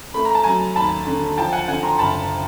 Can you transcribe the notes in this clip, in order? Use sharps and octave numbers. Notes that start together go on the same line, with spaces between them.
A3 B5
A#5
A5
F#3 G#5 A#5
D#2 A5 B5
D3
F3 G5 A5
F#5 G#5
D3 F#5 G#5
A#5 C6
F#1 A5 B5